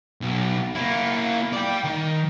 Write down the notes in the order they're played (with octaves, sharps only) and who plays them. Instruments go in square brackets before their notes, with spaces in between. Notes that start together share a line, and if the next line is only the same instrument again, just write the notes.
[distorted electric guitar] B1
A#3 E4
D5 G5
D#3